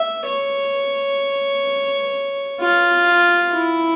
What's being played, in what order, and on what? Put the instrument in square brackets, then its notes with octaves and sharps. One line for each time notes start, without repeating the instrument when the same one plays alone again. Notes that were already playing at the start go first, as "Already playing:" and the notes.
Already playing: [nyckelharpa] E5
C#5
F4
E4